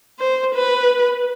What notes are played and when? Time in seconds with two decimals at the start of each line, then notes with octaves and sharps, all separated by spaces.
0.19 C5
0.55 B4